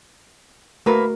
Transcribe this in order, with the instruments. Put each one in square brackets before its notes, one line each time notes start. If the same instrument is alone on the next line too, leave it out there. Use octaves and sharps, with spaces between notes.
[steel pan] A3 F#4 A#4 [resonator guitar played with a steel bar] A#3 B4